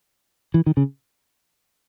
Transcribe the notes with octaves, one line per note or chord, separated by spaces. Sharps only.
E3
D#3
C#3